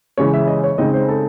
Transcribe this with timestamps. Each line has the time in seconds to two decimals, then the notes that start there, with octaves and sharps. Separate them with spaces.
0.18 C#3 E3 G#3 C#4 C#5
0.33 E5
0.48 D#5
0.64 C#5
0.78 C#3 G#3 C4 D#4 D#5
0.94 C5
1.08 A4